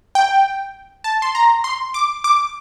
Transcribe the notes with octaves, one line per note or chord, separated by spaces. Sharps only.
G5
A5
C6
A#5
C6
D6
D6